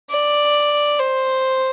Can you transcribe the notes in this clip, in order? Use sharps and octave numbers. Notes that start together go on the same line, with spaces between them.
D5
C5